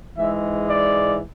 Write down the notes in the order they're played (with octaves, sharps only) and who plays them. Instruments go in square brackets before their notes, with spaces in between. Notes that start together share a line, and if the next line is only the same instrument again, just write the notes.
[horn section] G#2 E3 G#3 E5
D5